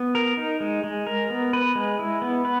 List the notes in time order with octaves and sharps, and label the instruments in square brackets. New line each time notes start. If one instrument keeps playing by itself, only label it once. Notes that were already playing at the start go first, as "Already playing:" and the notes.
Already playing: [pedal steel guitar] B3
A#4
D#4
G#3
G#3
A#4
B3
B4
G#3
E4
B3
B4